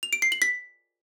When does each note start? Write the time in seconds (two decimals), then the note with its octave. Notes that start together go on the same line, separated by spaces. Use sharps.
0.03 F7
0.13 D7
0.22 C7
0.32 F#7
0.42 B6